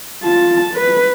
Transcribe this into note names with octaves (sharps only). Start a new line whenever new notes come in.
F4 A5
B4